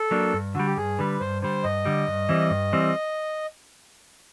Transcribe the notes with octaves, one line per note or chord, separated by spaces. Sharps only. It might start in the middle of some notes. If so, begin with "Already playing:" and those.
Already playing: A4
F#3 A#3 D4
G2
D3 G3 F#4
G4
G2 G#4
D3 G3 B4
G2 C5
D3 G3 C5
G2 D#5
D3 G3
G2
E3 G3 C4
G2
E3 G3 C4